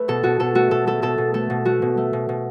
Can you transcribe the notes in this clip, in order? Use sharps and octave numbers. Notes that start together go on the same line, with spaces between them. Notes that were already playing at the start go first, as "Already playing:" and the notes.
Already playing: A3 B4
B2 A4
B2 F#4
B2 A4
A3 F#4
B2 A4
A3 A4
B2 A4
B2
A3 A4
B2
A3 F#4
B2
A3
B2
B2